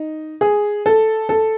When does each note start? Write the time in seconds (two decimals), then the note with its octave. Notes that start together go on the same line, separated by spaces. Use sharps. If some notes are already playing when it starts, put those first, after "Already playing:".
Already playing: D#4
0.41 G#4
0.86 A4
1.29 A4